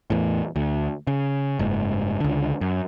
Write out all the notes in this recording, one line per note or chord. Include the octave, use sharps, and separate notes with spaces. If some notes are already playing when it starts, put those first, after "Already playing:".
E2 A2
D2
C#3
F#1 G#2
C#2 D3
F#2